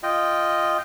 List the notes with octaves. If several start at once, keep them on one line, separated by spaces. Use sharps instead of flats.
F4 D#5 G5